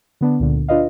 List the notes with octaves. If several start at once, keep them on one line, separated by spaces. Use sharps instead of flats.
D3 B3 D4
C#2 A#2 D3
D4 F4 B4 D#5 F5